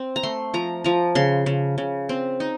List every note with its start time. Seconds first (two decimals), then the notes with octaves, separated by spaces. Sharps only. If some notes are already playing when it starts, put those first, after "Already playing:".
Already playing: C4
0.16 A#5
0.23 A3 C6
0.54 F3 A#5
0.84 F3 A#5
1.15 C#3 C6
1.46 C#3
1.78 C#3
2.09 C4
2.40 D#4